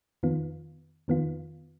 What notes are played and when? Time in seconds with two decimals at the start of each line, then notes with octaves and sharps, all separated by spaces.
0.23 F2 D#3 B3 F4
1.08 F2 D#3 B3 F4